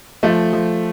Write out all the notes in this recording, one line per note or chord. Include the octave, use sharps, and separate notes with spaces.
F3 A3
F3